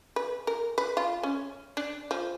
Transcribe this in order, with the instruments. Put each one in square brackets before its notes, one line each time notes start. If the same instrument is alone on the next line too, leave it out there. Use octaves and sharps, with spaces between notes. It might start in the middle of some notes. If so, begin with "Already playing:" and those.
[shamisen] B4
A#4
B4
F4
C#4
D4
F3